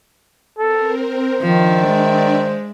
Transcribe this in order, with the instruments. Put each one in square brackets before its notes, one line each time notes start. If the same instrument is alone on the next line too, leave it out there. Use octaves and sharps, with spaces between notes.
[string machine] C4 A#4 [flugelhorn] A4
[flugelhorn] C5
[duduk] D#3 [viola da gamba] F3 [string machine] D4 D5 E5
[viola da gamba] G#3